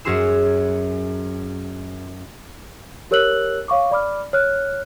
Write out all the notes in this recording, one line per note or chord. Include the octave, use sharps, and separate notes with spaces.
F#2 C#4 F#4 G#4 C6 E6
G4 A#4 C#5 E6 F#6 F#7
C#5 F5 C#6 D6
D5 B5 D6 F6
C#5 F6 F#6